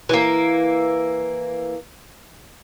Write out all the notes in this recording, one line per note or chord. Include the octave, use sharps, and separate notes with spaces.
E3 A#3